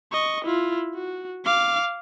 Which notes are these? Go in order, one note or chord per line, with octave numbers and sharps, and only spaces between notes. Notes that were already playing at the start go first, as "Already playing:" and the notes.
D#5 C#6
E4 F4
F#4
F5 D6